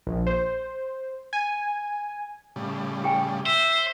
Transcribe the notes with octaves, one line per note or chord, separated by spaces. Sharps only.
A#1
C5
G#5
A2 C#3 G3
G4 G5 G#5
C5 E5